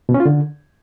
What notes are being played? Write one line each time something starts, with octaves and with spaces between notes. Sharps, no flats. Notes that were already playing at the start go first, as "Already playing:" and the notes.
B2
C#4
F4
D3